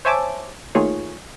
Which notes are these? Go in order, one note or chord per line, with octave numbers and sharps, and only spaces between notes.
C5 C#5 E5 G#5 A5 D6
D#3 A3 A#3 F4 G#4 C#5